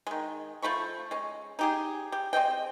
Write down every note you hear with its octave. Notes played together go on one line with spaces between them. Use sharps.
D#3 G#3
F3 A3 B5 C#6
G#3 C#4
D#4 G4 G#4
G4
C4 G#4 D#5 G5